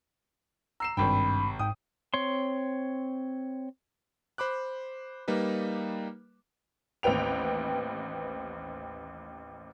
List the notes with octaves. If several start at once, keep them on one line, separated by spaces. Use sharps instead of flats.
A#5 E6 C7 E7
G#1 G2 C3 G5 B5
G#2 G5 D#6
C4 C#5 C6
C5 B5 D6 F#6
G3 A#3 D#4 B4
A1 D#2 C4 B4 G5 F7